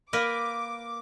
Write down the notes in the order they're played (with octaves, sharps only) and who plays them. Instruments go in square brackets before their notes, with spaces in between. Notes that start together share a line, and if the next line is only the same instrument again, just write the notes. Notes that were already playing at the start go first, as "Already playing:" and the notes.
[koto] A#3 A#4 B4 [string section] D6